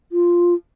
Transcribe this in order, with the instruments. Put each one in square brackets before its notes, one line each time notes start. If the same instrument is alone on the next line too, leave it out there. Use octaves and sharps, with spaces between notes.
[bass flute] F4